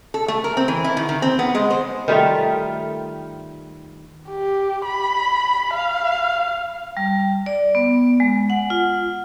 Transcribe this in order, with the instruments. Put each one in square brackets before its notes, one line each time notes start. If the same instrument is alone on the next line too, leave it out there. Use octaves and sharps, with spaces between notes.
[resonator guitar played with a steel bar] A4
A3
A#4
C4
E3
E4
D#3
D#3
C4
B3
G#3
C5
[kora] D#3 G3 A3 F4
[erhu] G4
B5
F5
[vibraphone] G3
D5
B3
G#3
F#5
F4